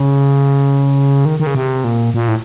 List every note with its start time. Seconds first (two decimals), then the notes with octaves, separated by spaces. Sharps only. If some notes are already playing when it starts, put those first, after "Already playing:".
Already playing: C#3
1.25 D#3
1.40 D#3
1.47 C#3
1.55 C3
1.84 A#2
2.14 A#2
2.28 A2